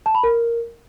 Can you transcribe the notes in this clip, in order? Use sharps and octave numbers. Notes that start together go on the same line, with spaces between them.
A5
B5
A#4